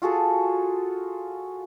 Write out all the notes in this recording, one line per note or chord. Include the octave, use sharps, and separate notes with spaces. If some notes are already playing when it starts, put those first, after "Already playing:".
F4 F#4 G#4 A4